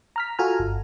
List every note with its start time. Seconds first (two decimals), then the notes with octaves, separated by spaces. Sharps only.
0.16 A#5 F6 B6
0.39 F4 F#4 A4 G#5 A#5 F6
0.59 G1